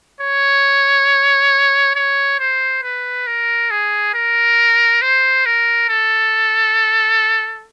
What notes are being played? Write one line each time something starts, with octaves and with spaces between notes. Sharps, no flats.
C#5
C#5
C5
B4
A#4
G#4
A#4
C5
A#4
A4